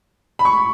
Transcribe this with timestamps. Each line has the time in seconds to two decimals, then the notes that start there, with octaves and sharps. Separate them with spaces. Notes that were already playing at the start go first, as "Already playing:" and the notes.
0.39 B5
0.45 C#6